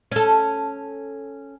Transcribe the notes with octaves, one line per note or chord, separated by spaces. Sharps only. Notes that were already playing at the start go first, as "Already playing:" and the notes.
C#4 A4